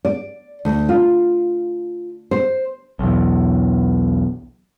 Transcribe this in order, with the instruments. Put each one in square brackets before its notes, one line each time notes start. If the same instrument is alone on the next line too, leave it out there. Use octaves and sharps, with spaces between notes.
[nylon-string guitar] D5
D2
F4
C5
[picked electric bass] B1 E2